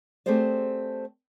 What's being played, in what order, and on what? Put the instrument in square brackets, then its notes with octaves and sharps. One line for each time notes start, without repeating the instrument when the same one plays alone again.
[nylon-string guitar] A3 C4 G4 G#4 C5 D5